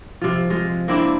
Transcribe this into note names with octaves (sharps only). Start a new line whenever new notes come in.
C3 F3
F3 G#3
A#3 C4 D4 E4